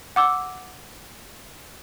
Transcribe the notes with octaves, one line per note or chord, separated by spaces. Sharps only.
F#5 D6 E6